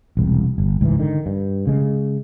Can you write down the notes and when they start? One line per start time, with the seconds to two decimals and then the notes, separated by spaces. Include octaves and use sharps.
0.17 E1 C2
0.58 G1
0.81 C#2 G#2 D#3 E3
0.99 D3 D#3
1.26 G2
1.67 C#3 G#3